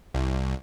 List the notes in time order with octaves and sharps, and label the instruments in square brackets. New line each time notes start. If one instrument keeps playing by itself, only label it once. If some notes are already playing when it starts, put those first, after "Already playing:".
[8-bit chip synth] C2